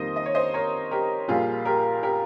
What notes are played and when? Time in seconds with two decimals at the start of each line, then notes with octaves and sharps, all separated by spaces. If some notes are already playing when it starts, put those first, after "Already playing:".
Already playing: F2 D#3 G3 A#3 C5 D#5
0.16 D#5
0.26 C#5
0.35 C5 D#5
0.54 A#4 C#5
0.91 G4 A#4
1.28 A#1 A#2 G3 A#3 F4 G#4
1.65 G4 A#4
2.03 G4 A#4